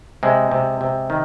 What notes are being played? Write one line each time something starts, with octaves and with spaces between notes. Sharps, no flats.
C3 G#3
C3
C3
D#3